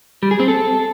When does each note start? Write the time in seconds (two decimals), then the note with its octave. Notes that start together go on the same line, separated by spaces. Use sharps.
0.23 G3
0.31 G#4
0.40 C4
0.48 A4